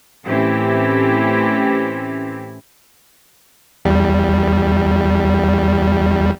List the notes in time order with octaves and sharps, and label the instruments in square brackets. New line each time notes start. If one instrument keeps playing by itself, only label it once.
[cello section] A2 E3 C4 C#4 E4 G4
[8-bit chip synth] E2 G3